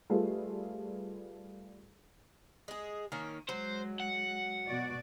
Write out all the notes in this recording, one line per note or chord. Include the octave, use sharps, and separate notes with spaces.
G3 A3 F4 G#4 A4 B4
G#3 G#4
D#3 A#3 C#4
F#3 G#3 C5
F#5
B2 F#4 D5